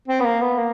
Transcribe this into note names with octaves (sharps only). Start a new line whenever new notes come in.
C4
B3
A#3
B3
A#3